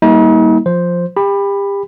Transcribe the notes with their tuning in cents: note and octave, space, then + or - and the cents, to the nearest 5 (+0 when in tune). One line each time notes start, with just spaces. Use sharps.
G3 +0 A#3 +20 D#4 +45
F3 +10 C5 +0
G4 +30 B5 +0